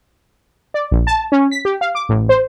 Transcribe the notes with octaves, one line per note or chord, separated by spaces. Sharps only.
D5
A#1
A5
C#4
B6
G4
F5
D6
A1
C5